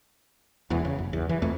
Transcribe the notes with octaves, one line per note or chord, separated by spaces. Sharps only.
E1 E2 E3 B3
C#3
F#1
E2
E3
E1 F2 A3